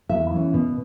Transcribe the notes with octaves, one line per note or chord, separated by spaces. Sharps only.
E2 E5
E3 C#4
B2